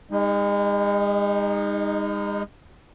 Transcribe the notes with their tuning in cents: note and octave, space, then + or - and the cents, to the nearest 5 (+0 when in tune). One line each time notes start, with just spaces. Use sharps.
G#3 -40 D#4 +0